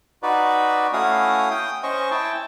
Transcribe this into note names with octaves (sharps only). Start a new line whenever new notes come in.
D#4 F#4 B4 D5
A3 C#4 E4 F#4 F5 D#6
G5 D#6
C#4 C5 D#5 C#6
E4 G5 A5